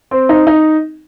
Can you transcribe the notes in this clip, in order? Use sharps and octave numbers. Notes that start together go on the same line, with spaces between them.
C4
D#4
D#4